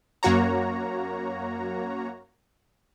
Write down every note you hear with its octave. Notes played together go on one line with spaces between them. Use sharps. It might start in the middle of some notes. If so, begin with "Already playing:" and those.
F#2 A#3 F#4 C#5 A#5